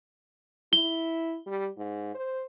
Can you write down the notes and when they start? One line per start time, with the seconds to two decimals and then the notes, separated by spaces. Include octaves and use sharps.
0.73 E4 G7
1.47 G3
1.77 G#2
2.14 C5